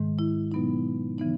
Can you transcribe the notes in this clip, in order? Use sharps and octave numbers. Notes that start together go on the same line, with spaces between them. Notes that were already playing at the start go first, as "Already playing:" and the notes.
Already playing: G#2 D#3 G#3
E4
B2 F#3 B3 D#4
C#3 E3 B3 D#4